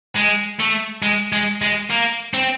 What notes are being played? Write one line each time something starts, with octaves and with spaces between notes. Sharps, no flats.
G#3
A3
G#3
G#3
G#3
A#3
C4